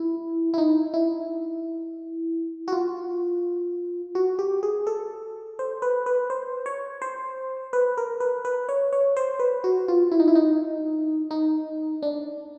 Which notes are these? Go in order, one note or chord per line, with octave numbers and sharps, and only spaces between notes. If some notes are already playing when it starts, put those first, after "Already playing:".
Already playing: E4
E4
D#4
E4
F#4
F4
F#4
G4
G#4
A4
C5
B4
B4
C5
C#5
C5
B4
A#4
B4
B4
C#5
C#5
C5
B4
F#4
F4
E4
D#4
E4
D#4
D#4
D4